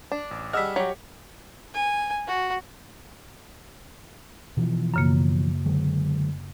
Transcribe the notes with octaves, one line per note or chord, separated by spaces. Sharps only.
D4
A1
G3 G#4 D#5 F#5 E6 F6 B6
F#3 G4 C#5
G#5
F#4
B2 E3 F3
F#2 C#3 A#3
D3 F#3 G#3